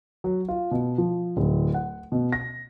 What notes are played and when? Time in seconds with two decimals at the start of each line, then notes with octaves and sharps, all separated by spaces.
0.24 F#3
0.48 F4
0.71 B2
0.98 F3
1.37 D1
1.74 F#5
2.12 B2
2.32 A#6